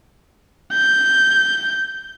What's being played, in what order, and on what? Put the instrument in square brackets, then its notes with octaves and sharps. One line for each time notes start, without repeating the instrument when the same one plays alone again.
[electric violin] G6